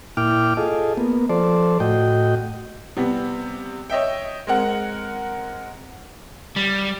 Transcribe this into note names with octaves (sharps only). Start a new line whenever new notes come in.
A#2 E4 G5 D6 F6
F4 G#4 A4 D#5
A#3 B3
F3 A4 C5 D5
A2 F#4 D#5 G5
C3 G3 B3
C#5 D#5 E5 G5
G#3 C4 A#4 F#5
G3